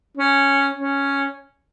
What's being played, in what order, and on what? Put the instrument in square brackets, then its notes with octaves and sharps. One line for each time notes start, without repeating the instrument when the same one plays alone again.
[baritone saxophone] C#4
C#4